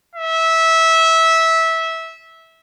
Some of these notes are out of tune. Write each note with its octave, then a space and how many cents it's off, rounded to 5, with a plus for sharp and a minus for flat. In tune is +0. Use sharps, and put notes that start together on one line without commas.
E5 -15